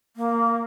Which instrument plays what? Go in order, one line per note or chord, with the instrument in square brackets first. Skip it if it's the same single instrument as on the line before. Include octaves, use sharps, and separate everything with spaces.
[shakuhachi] A#3